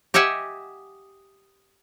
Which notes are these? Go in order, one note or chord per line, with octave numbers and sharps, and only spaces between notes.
G4 D#5 E5 F#5 G#5